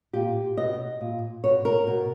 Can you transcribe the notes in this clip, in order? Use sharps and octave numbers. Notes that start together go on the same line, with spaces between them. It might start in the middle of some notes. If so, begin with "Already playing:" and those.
A#2 G4
B2 D#5
A#2
B2 C#5
A#4
B2